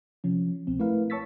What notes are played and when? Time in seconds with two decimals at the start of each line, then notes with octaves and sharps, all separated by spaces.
0.24 C3 F3 C#4
0.67 C2 B2 C4
0.79 A3 E4 A#4 B4 F5
1.10 C#5 A5 C#6 E6 A6 B6